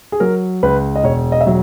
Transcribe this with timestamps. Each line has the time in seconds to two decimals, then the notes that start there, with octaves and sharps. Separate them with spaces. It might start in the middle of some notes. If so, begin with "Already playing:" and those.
0.12 G#4
0.20 F#3 A#4
0.63 C#2 B4
0.96 D#5
1.04 E1 C#5
1.32 D#5
1.41 E5
1.47 F#3